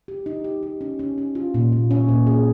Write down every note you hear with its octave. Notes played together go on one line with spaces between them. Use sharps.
G4
D#4
G4
G4
C#4
C#4
C#4
F4
A#2
A#2
C#4
A#2
G#4